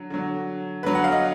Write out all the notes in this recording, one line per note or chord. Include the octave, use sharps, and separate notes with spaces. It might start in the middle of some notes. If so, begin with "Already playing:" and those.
Already playing: D3 F#3
D3 F#3
D3 F#3 B4
F#5
F5
D#5